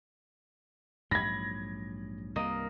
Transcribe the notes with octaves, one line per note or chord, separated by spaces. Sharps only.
A#1 G#2 F#3 B5 G#6 A#6
C2 G2 A#3 D#5